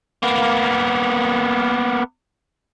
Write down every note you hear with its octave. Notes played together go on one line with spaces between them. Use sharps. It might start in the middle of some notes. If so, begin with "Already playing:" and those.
A#3 B3